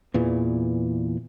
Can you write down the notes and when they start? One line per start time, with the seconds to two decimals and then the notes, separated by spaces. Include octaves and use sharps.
0.14 E2 A#2 E3